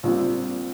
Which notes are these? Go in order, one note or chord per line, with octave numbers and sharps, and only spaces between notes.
A#1 A#2 G3 C4 F4